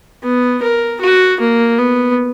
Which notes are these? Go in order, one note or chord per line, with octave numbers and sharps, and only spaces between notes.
B3
A#4
F#4
A#3
B3